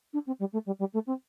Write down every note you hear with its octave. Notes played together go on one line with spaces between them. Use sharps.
D4
C4
G3
A3
G3
G3
A3
C4